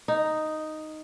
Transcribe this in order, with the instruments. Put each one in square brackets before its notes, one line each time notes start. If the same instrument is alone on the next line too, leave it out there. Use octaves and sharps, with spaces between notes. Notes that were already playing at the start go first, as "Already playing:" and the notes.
[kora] D#4